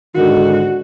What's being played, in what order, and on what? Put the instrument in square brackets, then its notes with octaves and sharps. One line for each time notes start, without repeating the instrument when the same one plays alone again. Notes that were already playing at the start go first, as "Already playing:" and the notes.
[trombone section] G#2 D3 D#3 [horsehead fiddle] F#4